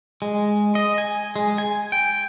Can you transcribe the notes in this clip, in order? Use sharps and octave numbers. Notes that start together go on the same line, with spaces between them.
G#3
D#5
G#5
G#3
G#5
G5